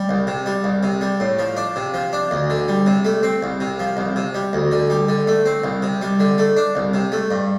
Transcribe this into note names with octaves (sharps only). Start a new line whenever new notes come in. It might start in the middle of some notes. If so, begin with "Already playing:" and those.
Already playing: G3
C2
C3
G3
C2
C3
G3
A2
F3
D4
C3
F3
D4
D2
D3
G3
C3
A3
C4
C2
C3
F3
C2
C3
G3
D2
D3
G3
D3
A3
C4
C2
C3
G3
D3
A3
D4
C2
C3
A3
G2